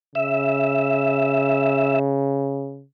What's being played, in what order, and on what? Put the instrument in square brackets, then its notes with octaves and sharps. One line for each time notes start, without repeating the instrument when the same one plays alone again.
[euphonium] C#3 [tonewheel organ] E5